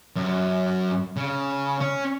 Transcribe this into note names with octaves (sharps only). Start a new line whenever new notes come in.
F#2
C#3
C#4